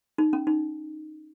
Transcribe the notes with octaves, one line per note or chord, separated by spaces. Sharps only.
D#4
C#4
D#4